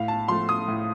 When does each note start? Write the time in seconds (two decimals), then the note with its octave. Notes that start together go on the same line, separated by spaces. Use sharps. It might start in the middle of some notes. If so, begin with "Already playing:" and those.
Already playing: A2 F5
0.08 A5
0.28 F3 A3 C6
0.49 D#6
0.68 A2